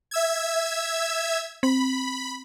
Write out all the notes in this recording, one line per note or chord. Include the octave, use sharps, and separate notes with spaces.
E5 E6 G#6
C4 B5